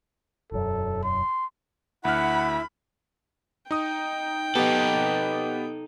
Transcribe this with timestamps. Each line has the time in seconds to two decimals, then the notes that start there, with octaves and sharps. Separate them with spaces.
0.52 E1 F#2 A4
1.03 C6
2.05 D2 E4 E5 F#5 B5 F6
3.71 D#4 G5 D#6
4.55 B3 D#4 G4 A4